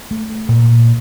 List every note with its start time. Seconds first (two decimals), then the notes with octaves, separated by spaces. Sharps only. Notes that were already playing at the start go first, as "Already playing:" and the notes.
0.11 A3
0.49 A#2